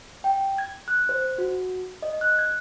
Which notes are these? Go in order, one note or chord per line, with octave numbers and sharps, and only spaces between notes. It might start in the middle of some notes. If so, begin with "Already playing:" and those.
G5
G#6
F#6
C5
F#4
D#5
F#6
G#6